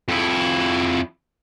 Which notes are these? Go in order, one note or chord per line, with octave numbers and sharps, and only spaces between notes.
F2 E4